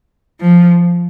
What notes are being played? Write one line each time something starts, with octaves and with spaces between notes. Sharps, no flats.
F3